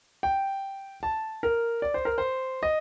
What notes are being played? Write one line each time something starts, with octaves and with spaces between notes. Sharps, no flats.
G5
A5
A#4
D5
C5
A#4
C5
D#5